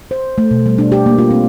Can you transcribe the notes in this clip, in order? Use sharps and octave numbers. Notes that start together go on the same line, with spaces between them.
C5
A3
B2
G3
D4
G4
A#3
F4
C4